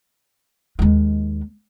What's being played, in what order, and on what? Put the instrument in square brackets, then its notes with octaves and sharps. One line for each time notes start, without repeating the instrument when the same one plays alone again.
[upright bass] D#2 G#3